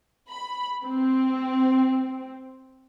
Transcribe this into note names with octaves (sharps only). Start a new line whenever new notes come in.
B5
C4